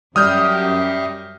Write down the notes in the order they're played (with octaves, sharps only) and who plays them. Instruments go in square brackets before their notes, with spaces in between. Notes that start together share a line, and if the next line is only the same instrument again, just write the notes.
[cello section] F#2 G4 [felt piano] G3 [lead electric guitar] C#5 E5 [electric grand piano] D#6 F6 G6